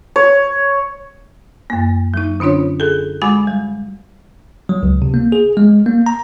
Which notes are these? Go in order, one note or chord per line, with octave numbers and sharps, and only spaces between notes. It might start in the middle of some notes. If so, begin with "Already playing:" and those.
C#5
F#2 A#3
F#3 D#4
D3 C#4 D4 F4 C#5
G#4 A4
G#3 F#4 G#5 B5 D6
G3
F#3
C#2
C3
A#3
G#4
G#3
A#3
A#5